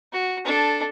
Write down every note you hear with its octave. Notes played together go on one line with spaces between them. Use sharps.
F#4
D4 A4